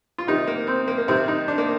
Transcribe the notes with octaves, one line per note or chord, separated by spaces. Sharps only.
F4
C3 D#3 D#4
A#3
C4
A#3
A#3
C3 D#3 C4
D#4
D4
A#3